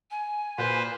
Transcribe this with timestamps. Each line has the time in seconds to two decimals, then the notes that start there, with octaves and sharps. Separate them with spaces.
0.11 G#5
0.58 A#2 B4 C5